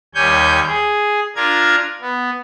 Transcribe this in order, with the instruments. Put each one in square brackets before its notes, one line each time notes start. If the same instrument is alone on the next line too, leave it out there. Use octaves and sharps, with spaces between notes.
[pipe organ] D#2 G3 C#5 G#5 G6
G#4
D4 F4 A#4 G#6
B3